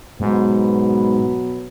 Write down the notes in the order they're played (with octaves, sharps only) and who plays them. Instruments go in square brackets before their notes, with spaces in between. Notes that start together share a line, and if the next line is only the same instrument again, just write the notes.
[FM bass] G#2 [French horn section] B2 F#3 B3